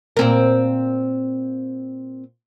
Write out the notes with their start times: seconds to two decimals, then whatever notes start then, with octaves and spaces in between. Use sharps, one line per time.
0.17 A#2 C4 A#4